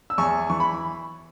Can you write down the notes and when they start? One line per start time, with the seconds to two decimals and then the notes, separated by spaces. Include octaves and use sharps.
0.10 E6
0.18 E2 G#5 C#6
0.50 E3 C#6
0.60 B5